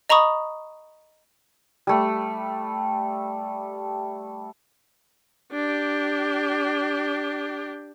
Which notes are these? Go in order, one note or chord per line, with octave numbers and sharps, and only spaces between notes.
D#5 A#5 B5 C#6 D#6
G3 A3
D4 G4